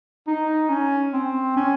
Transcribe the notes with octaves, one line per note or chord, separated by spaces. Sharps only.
D#4
C#4
C4
C#4